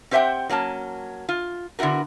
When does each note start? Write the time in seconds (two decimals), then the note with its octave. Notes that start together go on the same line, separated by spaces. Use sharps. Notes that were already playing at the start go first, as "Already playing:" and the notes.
0.11 C4 G4 C5 E5 F#5 G5
0.49 F#3 A#3 C#4 A5
1.29 F4
1.79 D3 B3 E4 F#4 A#4